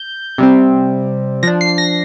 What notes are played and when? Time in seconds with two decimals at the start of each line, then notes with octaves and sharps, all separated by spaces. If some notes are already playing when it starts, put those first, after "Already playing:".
Already playing: G6
0.38 C3 G3 C4
1.43 F3 D4 A#6
1.61 C7
1.78 A#6